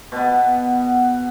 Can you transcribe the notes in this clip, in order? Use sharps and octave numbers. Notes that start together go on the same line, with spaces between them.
B2 B3